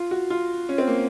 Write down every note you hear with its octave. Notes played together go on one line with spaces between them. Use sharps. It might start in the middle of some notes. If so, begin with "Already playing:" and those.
Already playing: F4
F#4
F4
C#4
C4
A#3